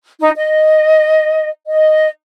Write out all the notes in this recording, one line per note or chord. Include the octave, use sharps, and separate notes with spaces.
D#4
D#5
D#5